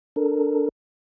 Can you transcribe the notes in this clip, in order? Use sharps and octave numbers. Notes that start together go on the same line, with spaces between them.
D4 A4 A#4